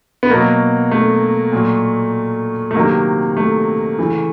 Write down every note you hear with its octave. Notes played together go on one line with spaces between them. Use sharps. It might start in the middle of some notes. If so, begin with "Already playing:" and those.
B3
B2 F#3 A#3
A3
A#2 F#3
A3
C3 D#3 F#3 A#3
A3
C#3 E3